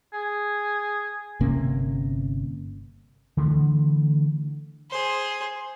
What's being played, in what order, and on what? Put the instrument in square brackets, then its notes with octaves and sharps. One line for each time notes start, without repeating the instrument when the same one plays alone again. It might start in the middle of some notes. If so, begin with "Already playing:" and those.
[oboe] G#4
[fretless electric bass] G1 C3 A#3 C#4
[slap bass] D3 E3 G#3 A3
[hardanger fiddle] G#4 C5